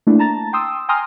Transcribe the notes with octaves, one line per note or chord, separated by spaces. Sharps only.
A3 A#3 D4 E4
A5 A#5 A6
G5 C6 D#6 E6
G5 G#5 A#5 C6 D#6 F6